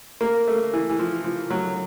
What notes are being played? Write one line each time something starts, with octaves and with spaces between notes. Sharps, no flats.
A#3
A3
E3
E3
F3
F3
F#3